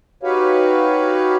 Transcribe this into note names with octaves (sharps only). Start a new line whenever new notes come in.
D#4 F#4 G4 B4 C#5 F5